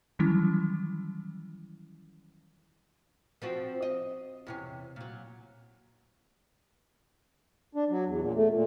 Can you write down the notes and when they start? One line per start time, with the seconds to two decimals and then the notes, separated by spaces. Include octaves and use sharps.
0.19 D#3 E3 F#3 G3 C#4 E4
3.42 F3 C4 F#4
3.82 D#5
4.47 E2 C3 C#4
4.96 A#2 F#3
7.75 D4
7.90 F#3
8.06 E2
8.22 A#2
8.35 A3
8.51 A#2